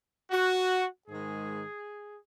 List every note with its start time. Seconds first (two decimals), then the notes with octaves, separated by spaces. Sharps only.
0.30 F#4
1.08 G#2 D#3 G#3 G#4